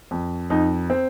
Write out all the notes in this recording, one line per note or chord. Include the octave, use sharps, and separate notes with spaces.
F2
F2 D#4
C4